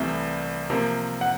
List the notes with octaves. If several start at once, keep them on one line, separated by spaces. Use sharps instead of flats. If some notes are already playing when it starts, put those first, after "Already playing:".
Already playing: C2 C3 E3 A3
C3 F3 A#3
F#5